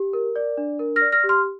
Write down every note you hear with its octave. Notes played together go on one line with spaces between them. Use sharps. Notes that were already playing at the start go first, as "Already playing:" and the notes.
Already playing: G4
A#4
D5
D4
A#4
F6 A#6
D5
F6 A#6
G4
C6 F6